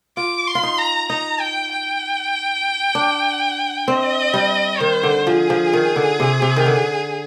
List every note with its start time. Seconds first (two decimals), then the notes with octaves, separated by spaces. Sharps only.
0.17 F4 D6
0.48 C6
0.55 F4
0.63 D#4
0.78 A#5
1.09 D#4 A#5
1.40 G5
1.71 G5
2.95 D4
3.88 C4 D#5
4.34 G3
4.80 D#3 C5
5.03 D3
5.26 F3 G#4
5.50 F3
5.73 D#3
5.96 D3
6.20 C3
6.42 C3
6.56 D#3
6.66 D3